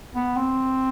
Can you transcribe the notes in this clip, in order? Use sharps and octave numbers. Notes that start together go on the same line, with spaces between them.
B3
C4